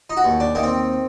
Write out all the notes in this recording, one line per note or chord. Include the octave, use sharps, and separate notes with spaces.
D#4
F#4
D#2
D4
D#3 A#3
C4